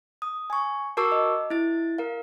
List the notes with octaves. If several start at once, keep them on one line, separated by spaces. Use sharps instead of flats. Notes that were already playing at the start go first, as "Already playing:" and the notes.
D#6
G#5 C#6
F#4 A#4 A5 C#6 D6 E6
D#5
E4 A6
A#4 F5